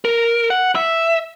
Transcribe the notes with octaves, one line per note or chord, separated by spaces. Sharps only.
A#4
F#5
E5